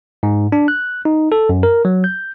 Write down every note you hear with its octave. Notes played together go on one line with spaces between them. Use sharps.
G#2
D4
F#6
D#4
A4
F#2
A#4
F#3
G6